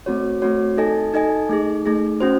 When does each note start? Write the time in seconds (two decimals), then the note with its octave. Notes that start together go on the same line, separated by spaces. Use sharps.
0.06 A3 C4 F#4 C#5
0.42 A3 C4 F#4 C#5
0.77 D#4 A4 D#5 G#5
1.14 D#4 A4 D#5 G#5
1.49 A3 D#4 G#4
1.86 A3 D#4 G#4
2.20 C#4 F#4 C5